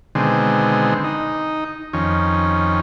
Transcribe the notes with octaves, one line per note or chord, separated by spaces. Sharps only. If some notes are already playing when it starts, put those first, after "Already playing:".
B2 D3 D#3 G#3 C4
D#4
F2 D#3 C#4